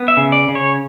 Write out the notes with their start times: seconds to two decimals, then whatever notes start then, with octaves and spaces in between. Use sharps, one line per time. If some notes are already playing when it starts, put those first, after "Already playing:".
Already playing: B3
0.08 E5
0.17 C#3
0.32 D5
0.48 C#3
0.55 C#5